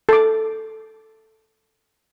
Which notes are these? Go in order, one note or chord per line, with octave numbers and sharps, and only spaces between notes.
A4 D6